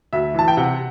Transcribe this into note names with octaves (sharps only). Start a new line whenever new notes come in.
D2 E5
E3 A5
G5
C3 F#5